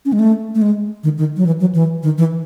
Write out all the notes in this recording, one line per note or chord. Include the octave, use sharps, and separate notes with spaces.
C#4
G#3
A3
A3
G#3
D#3
D#3
F#3
E3
F#3
E3
D#3
E3